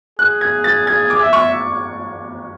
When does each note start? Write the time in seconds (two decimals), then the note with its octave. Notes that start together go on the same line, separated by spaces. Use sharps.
0.19 G#4 F#6
0.41 G#6
0.64 A6
0.87 G#4 G#6
1.10 D6
1.22 E5
1.33 C#6